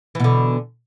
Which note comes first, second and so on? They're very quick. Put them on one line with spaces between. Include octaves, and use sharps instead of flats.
E3 B2 D3